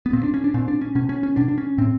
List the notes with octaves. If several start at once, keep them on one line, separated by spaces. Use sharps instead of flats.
B3
A#2 C4
D4
C#4
D4
A#2 C4
D4
C#4
B2 C#4
C#4
C#4
B2 D4
D4
C#4
A2 C4